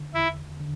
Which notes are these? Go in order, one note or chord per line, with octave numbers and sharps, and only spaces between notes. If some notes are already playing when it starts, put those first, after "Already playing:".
Already playing: D3
E2 E4
D3